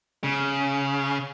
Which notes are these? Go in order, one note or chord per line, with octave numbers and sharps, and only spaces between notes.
C#3